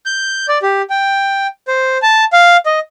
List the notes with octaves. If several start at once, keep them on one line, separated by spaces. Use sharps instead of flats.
G6
D5
G4
G5
C5
A5
F5
D#5